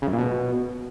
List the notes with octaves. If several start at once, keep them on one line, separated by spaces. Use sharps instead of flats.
C#3
F#2
A#2
B2